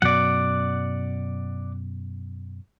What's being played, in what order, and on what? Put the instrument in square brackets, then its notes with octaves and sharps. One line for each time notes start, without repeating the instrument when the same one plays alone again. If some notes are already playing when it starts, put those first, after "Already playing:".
[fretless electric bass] F#2 B2 F#3 [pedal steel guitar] D5 F#5